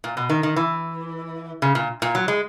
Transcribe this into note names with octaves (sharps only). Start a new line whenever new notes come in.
A#2
B2
D#3
D#3
E3
C#3
A#2
A#2
F#3
G#3